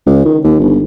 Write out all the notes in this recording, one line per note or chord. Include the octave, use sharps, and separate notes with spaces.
C#2
D#3
D#2
G1